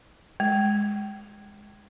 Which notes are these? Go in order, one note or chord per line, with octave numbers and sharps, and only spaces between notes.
G#3